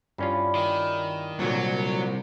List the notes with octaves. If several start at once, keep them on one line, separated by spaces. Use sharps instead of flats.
G2 C#4 E4 F4 D5
D#3
C2 A#2 D3 F#3